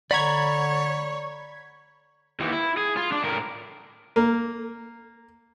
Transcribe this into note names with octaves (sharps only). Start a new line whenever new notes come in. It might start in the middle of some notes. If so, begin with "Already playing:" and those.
D3 C#5 D5 F#5 A#5 B5 G#6
D#2 E3
E4
G#4
F4
D4
A2 A#4
A#3